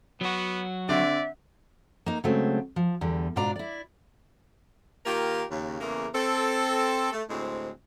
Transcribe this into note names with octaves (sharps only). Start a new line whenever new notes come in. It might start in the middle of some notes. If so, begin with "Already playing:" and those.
F#3 B3 F#4
D3 C4 D5 E5
A#3 D#4
C#3 F#3 G#3 A3 C4
F3
E2 D3 G3
G#2 B2 D4 F4 D5 A#5
E4 D5
D#3 A#3 F4 G4 A#4
D#2 C#3
E2 C#3 A3 A#3
C4 A4
A3
D2 A2 G#3 C4